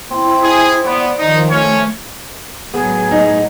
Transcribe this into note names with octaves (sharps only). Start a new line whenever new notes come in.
C4 E4
G#4
B3 D5
D#3 F3 D#4
A3 C#4 C#5
A2 F#3 B3 G#4
D#4